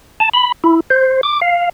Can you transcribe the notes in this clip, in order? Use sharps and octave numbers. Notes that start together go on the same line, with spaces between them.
A5
B5
E4
C5
D6
F5